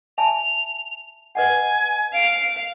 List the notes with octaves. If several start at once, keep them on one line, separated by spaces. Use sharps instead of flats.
E5 G#5 A5 F7
B4 D#5 F#5 G#5
F5 D7